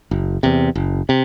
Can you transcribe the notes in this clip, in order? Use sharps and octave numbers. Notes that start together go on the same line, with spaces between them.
F#1
E2 C3
F#1
C3